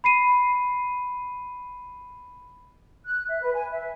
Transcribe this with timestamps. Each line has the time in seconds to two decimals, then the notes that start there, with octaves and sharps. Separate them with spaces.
0.04 B5 C7 D#7
3.04 F#6
3.29 E5
3.41 B4
3.54 G#5
3.71 E5